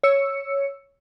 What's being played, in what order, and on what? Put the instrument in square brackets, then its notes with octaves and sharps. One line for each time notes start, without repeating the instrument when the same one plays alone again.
[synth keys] C#5 E6 C#7